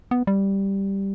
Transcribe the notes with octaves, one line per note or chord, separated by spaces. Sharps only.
B3
G3